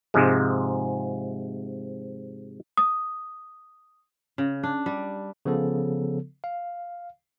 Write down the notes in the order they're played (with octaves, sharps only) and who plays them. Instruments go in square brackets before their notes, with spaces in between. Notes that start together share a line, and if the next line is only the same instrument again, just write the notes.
[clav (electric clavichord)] G#2 C3 F3 G#3
[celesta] D#6
[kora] C#3
D4
G3
[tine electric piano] C#3 F3 B3 A4
F5